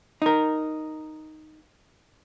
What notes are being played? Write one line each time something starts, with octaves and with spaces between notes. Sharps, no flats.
D#4 A#4